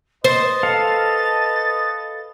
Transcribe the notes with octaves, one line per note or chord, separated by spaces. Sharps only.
B4 C5 D#5 A6
A4 F5